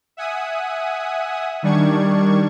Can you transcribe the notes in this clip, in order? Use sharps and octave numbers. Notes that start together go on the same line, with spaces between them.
E5 F#5 G#5 D#6
D#3 G3 D4 C#6 G#6